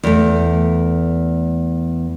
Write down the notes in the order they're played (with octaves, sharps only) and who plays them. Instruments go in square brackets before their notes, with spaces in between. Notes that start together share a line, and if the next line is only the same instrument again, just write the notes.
[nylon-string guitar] E2 A3